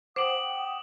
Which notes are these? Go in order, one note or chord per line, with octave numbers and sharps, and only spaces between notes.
C5 F#5 G5 D6 D#6 D7 F#7